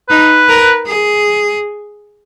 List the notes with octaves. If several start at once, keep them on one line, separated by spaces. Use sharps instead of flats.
D#4 B4
A#4
G#4